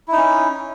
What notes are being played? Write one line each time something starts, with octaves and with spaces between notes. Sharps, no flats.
C#4 D#4 E4